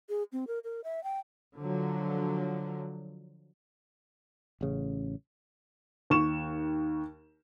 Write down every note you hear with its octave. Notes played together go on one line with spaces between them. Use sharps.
G#4
C4
A#4
A#4
E5
G5
D3 F3 F#3
A1 C#3
D#2 C#6 E7